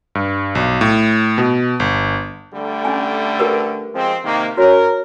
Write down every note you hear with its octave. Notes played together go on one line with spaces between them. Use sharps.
G2
B1
A2
B2
G1
D3 G3 A3
C#4 G#5
G4 A#4 B4
F3 G#3 C4
C3 D#3 A#3
C#4 F#4 A#4 C#5